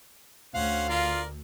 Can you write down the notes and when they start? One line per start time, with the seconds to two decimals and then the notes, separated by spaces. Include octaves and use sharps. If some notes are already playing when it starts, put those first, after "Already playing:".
0.55 D2 C#4 C5 F5 F#5
0.89 F4 A#4 D5